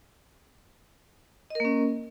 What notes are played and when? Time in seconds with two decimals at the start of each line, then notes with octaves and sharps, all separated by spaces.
1.50 D#5
1.55 A#4
1.60 A#3
1.65 C#4